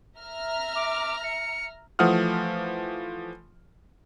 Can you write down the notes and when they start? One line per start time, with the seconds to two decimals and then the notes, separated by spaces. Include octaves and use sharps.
0.19 E5 A#5 F6
0.75 D6
1.24 C#7
1.99 E3 F3 A3 F#5 D#6 F6